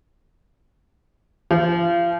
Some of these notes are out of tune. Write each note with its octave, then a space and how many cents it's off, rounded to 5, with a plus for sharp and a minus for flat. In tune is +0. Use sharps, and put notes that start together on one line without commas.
F3 -30